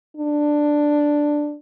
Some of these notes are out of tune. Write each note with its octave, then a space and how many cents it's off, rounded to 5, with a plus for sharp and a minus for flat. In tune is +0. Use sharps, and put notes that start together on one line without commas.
D4 +5